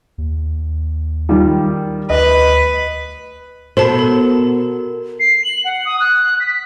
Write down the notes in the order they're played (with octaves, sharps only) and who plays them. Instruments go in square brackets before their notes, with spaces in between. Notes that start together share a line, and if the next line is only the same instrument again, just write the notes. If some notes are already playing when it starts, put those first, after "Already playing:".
[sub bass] D#2
[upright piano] D#3 G3 F4
[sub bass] D2 [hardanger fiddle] B4 [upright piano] D#5
[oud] B2 [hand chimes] F#4 A#4 [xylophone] A4 A5 B5 [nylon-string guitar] C5
[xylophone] A4
[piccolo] C7
F#7
F#5
D#6
F#6
B6